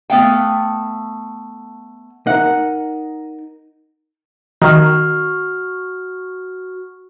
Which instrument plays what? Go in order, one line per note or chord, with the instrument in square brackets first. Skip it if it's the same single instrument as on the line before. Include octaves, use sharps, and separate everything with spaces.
[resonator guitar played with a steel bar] A3 B3 F5 G5
[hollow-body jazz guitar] D#4 A#4 [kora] F#5
[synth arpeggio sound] D#3 [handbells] F#4 F6